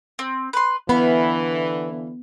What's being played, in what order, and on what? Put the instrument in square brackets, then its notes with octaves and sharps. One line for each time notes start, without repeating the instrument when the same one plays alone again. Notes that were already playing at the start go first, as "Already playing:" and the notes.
[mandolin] C4
B4 C6
[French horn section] D3 E3 [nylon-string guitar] B3 [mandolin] F5 B5